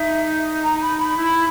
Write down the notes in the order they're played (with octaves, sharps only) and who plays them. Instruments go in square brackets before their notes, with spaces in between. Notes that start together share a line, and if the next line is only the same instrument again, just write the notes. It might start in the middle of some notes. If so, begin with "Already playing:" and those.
Already playing: [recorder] D#4 [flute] E5
[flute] A#5
B5
B5
[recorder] E4